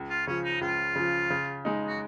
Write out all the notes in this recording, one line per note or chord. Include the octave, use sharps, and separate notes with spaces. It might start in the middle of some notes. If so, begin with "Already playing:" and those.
Already playing: C#2
F4
C#3 F3 C#4
D#4
C#2 F4
C#3 F3
C#3
G#3 D#4
F#4